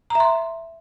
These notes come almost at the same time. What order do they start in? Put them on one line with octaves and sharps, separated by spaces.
A#5 E5 C6